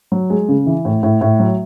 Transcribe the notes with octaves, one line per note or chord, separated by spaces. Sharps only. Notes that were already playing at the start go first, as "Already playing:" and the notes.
F#3
G#3
C#3
E3
A2
A2
A2
F#3